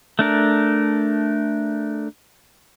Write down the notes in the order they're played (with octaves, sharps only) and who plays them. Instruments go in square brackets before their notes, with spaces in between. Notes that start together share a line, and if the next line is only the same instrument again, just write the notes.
[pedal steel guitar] A3 D4 A#4